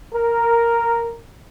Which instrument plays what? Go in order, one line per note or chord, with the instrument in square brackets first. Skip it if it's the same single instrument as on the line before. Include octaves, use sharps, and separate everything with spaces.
[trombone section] A#4